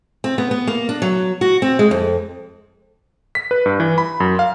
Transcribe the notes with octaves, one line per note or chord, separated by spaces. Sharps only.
C4
B3
B3
A#3
D4
F#3
F#4
C4
G#3
F2
B6
B4
G2
E3
B5
F#2
F5